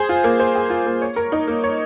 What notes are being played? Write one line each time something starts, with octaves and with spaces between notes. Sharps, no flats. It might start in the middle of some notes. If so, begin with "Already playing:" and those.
Already playing: G#4 C5
F4
A#3
C5
G#4
F4
A#3
C#5
A#4
D#4
A#3
C#5